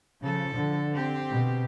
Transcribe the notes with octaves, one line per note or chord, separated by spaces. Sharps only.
C#3 F3 A4
D3
C4 G4
B2